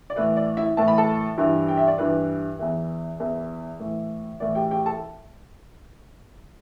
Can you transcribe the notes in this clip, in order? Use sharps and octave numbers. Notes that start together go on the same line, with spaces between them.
D5
A2 E3 B4
D5
E4 E5
A2 E3 A5
B5
A4 A5
G2 E3
G5
E5
D5
G2 E3 B4
E2 E3
E2 E3
A2 E3
A2 E3 D5
G4 G5
G4 G5
A4 A5